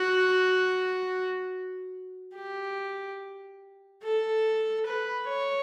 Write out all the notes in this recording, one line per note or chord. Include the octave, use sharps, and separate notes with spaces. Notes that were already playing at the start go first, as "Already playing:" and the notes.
Already playing: F#4
G4
A4
B4
C#5